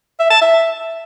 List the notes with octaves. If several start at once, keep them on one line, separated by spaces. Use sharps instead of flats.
E5
A5
E5